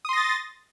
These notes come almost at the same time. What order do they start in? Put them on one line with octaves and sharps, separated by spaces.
D#6 C6 A#6 A6